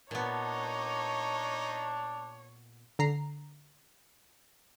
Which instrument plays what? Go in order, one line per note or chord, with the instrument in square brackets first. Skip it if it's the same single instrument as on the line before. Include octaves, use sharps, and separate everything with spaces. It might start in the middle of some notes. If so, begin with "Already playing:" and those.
[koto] A#2 B3 [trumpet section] D4 [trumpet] D#4 [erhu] C#5
[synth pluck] D3 A#5 C7